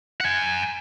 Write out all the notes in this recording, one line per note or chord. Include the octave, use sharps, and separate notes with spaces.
F#5 G#5